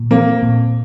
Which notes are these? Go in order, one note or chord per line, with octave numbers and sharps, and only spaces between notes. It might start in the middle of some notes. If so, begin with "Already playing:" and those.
Already playing: A#2
A#3 C4
A#2